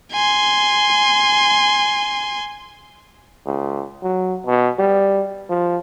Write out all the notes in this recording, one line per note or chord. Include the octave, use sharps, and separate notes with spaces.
G#5 C6
C#2
F#3
B2
G3
F3